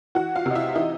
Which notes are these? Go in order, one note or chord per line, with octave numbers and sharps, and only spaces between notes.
E3 F#4 F#5
F4 F5
C3 D#5
E4 E5
E3 D#4 D#5